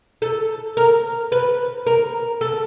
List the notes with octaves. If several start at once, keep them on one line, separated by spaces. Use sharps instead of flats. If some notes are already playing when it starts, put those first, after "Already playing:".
A4
A#4
B4
A#4
A4